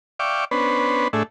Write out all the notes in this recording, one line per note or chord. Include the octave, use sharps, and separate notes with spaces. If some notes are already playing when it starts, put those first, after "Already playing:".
D5 E5 F5 G5 C#6 D6
B3 C#4 D4 B4 C5
A2 A3 D4 G#4 E5